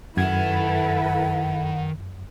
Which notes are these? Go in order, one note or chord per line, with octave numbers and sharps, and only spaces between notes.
F#2 D#3 E4 A4 B4 F#5 G5 G#6